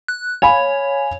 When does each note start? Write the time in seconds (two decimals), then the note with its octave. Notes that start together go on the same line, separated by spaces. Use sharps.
0.08 F#6
0.42 C#5 F5 G#5 B5